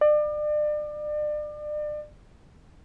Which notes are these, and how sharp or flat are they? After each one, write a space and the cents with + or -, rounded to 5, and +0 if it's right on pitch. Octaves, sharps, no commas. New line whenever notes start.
D5 +35